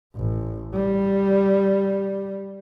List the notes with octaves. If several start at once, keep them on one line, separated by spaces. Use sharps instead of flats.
A1
G3